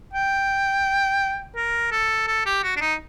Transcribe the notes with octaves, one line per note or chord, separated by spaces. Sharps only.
G5
A#4
A4
A4
G4
F#4
D4
D#4